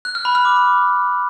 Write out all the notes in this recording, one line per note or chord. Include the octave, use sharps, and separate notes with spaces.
F#6
F6
B5
F6
D6